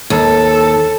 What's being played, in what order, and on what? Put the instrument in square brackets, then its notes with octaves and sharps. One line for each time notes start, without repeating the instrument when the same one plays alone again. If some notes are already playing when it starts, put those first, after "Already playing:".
[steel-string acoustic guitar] D#2 [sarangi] A4